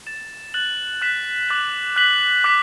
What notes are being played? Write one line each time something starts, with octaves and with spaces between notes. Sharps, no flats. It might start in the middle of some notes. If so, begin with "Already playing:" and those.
A6 E7
F#6 A6 F#7
F#6 B6 E7
D6 F#6 A6 F#7
F#6 B6 F#7
D6 F#6 B6